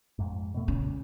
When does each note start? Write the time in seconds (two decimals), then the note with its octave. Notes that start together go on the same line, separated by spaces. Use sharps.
0.19 F2 G#2
0.54 B2 A3
0.68 A#2 C#3 C#4